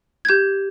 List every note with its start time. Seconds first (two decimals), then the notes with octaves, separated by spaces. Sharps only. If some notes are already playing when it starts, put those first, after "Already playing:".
0.25 G#6
0.29 G4 G6